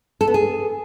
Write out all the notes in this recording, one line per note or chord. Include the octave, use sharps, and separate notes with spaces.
A4
B3
G#4